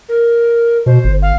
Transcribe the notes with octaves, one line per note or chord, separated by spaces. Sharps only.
A#4
B2 C5
G1
F5